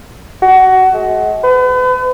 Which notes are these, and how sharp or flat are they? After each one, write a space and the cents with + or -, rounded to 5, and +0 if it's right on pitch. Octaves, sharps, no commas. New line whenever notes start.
F#4 +20
G#3 +35
B4 +40